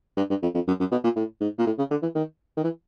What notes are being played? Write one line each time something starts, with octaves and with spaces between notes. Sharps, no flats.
G2
G2
F2
F2
F#2
F#2
B2
A#2
A2
G#2
A#2
A2
C#3
D3
E3
D#3
D#3
E3